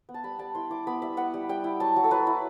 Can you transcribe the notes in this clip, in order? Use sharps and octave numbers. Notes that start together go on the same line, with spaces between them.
B3
A5
G3 B5
G3 A5
E4 C6
E4 D6
B3 B5
G3 E5
B3 F#5
G3
G3 G5
E4
F#3 A5
F#3
A4
F#3 B4
E4